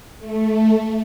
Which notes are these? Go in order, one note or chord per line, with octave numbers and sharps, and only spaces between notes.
A3